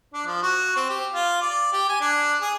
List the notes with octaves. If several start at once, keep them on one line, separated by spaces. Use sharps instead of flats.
D4
F3
F#4
C4
G4
F4
D5
G4
G#5
D4
G#4